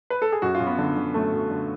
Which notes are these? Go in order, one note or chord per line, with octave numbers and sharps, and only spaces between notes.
B4
A4
G#4
F#2 F#4
F4
F#2
B3
D3
D3
F#2 A3
F#2
D3